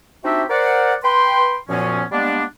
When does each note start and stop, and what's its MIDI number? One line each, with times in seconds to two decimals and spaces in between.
0.24 0.44 60
0.24 0.44 62
0.24 0.44 63
0.24 0.44 66
0.24 0.44 67
0.24 0.44 76
0.49 0.94 70
0.49 0.94 72
0.49 0.94 74
0.49 0.94 78
1.03 1.57 71
1.03 1.57 79
1.03 1.57 84
1.69 2.03 42
1.69 2.03 46
1.69 2.03 53
1.69 2.03 59
1.69 2.03 61
2.11 2.43 55
2.11 2.43 56
2.11 2.43 58
2.11 2.43 59
2.11 2.43 62